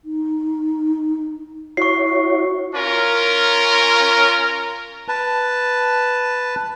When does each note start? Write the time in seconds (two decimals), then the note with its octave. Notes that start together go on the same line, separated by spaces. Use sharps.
0.05 D#4
1.77 E4 F#4 C#5 C#6 C7
2.75 C#4 F4 A#4
5.08 B4 A5